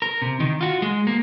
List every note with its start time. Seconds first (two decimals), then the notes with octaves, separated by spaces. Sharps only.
0.02 A#4
0.22 C3
0.40 D#3 D#4
0.61 F4 F#4
0.82 G#3
1.07 A#3